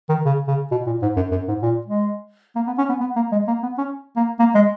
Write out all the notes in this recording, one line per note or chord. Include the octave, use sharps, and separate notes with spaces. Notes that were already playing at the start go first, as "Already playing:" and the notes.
D#3
C#3
C#3
B2
A#2
G#2
F#2
F#2
G#2
A#2
G#3
A#3
B3
C#4
B3
B3
A#3
G#3
A#3
B3
C#4
A#3
A#3
G#3